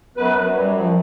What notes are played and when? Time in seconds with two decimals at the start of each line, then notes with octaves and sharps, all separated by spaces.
0.17 F#2 B3 B4
0.37 F#2 B4
0.55 G3
0.79 F3